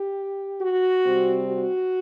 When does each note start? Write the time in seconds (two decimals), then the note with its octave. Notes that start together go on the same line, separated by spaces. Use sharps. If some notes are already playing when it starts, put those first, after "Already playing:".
Already playing: G4
0.62 F#4
1.05 C3 G3 C4
1.48 F#4